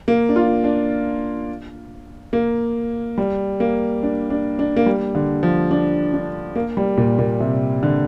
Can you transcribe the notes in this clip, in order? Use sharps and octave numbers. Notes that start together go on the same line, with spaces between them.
A#3
D4
F4
D4
A#3
G3
A#3
D4
D4
D4
A#3
G3
D3
F3
D4
D4
A#3
G3
A#2
A#2
C3
D3